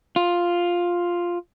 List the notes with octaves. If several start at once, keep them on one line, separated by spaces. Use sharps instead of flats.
F4